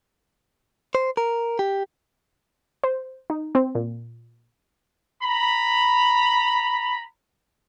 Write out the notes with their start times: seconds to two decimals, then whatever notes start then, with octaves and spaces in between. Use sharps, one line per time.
0.95 C5
1.17 A#4
1.59 G4
2.84 C5
3.30 D#4
3.55 C4
3.75 A#2
5.23 A#5 B5